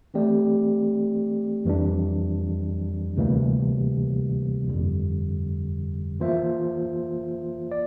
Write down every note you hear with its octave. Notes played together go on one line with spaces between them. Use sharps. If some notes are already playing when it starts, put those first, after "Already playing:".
E3 A3 C4 G4 D5
F2 E3 G3 D4
D2 C3 E3 G3 A#3
G1 F2 D3 G3
E3 A#3 F4 C5 E5
D5